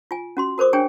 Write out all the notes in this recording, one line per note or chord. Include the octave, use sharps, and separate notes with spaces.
F4 G#5
C#4 F#4 C6
F#4 A#4 C5 D6 D#6
D4 G#4 C#5 G5 G#5